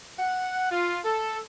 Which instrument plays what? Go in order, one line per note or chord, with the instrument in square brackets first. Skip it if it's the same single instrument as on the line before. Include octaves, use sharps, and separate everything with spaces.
[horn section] F#5
F4
A4